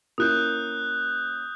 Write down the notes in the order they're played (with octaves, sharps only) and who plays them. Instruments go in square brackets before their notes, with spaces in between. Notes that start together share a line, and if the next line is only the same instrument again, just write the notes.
[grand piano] A#3 C#4 E4 [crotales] D#6 F#6 G6